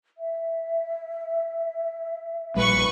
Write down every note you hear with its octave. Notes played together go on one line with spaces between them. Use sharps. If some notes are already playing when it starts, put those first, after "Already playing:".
E5
A#1 A#2 G3 B4 C#6